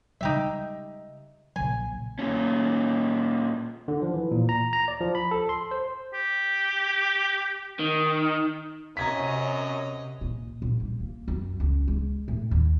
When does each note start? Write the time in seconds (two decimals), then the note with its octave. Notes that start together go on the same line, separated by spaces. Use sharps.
0.21 C#3 G3 G#3 D#4 G4 E5
1.56 A#1 C#3 F#3 G#5
2.19 A#2 C#4
3.88 D3
4.02 F3
4.14 E3
4.31 A#2
4.49 A#5
4.73 A#5
4.88 D5
5.00 F3
5.15 B5
5.31 A4
5.49 C6
5.71 C5
6.14 G4
7.80 D#3
8.97 F#2 C3 C#4 D#5 A#5 G#6 B6
10.21 A#2
10.62 A#1
10.80 G3
11.00 A#3
11.28 F#2
11.60 C#2
11.88 G#3
12.28 A2
12.51 D#2